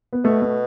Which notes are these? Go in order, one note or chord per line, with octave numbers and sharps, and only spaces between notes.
B3
B2 A3
A3